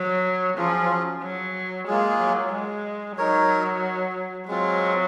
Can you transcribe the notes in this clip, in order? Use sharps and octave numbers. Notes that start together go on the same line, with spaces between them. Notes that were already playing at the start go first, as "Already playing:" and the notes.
Already playing: F#3
F3 F#3 C#4 F4 G#4
F#3
G#3 A#3 F4 G#4
F#3
G#3
F#3 D#4 A#4 C#5
F#3 G#3 C4 F4